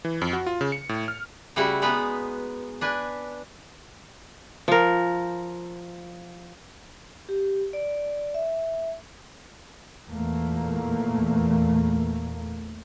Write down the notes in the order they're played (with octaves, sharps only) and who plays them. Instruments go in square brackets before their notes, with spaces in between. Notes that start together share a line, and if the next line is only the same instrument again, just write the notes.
[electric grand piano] E3
F2
F#4
F4
C#3
C#7
A2
F6
[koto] C#3 G3 A3 E4 F#4
G#3 B3 D#4 B4
D4 B4 G#5
[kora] F3 A#4
[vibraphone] G4
D5
E5
[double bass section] E2 A#2 A3 A#3